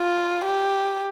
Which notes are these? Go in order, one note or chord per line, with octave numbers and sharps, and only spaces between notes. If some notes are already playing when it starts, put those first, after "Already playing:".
Already playing: F4
G4